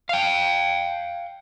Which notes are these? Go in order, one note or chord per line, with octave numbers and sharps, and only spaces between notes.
F5 G5